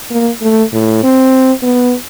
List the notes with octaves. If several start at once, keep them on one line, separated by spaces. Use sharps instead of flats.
A#3
A3
A2
C4
B3